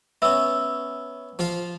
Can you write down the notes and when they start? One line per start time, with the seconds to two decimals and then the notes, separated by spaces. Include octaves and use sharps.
0.22 B3 C#4 E5 E6
1.39 F3 F4 F5